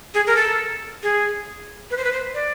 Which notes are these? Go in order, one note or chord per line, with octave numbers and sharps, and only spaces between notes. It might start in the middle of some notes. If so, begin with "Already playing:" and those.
G#4
A#4
A4
G#4
B4
C5
B4
C5
D5